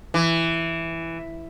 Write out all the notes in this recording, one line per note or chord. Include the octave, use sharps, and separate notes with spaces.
E3